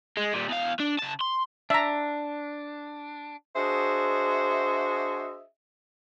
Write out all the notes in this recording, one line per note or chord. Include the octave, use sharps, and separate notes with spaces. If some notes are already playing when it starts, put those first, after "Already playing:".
G#3
A#2 G3
E2 F5
D4
C#3 A5
C6
D4 E5 A#5
D4 F#4 G#4 C5 D#5 E5